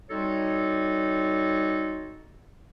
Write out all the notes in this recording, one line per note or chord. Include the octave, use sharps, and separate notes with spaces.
G3 C4 D#4 F#4 A4 C#5